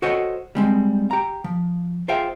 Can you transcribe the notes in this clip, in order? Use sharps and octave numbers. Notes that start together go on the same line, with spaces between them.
F#4 A4 C5 C#5 D#5 F#5
G3 G#3 C4
G4 A#5
F3
F4 G#4 C5 E5 F5 G5